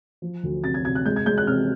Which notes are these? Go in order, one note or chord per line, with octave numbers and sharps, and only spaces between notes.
F3
D2
C3 A6
G#6
C3 G#6
F#6
G#3 G6
G#6
G#3 G6
F#6
C3 F6